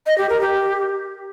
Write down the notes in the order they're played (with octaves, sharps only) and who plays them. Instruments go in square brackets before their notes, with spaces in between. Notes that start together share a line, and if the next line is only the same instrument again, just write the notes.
[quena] D#5
G4
A#4
G4